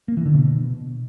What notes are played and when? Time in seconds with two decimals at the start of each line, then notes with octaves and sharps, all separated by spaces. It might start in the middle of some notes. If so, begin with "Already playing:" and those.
0.08 A#3
0.17 E3
0.26 D3
0.34 B2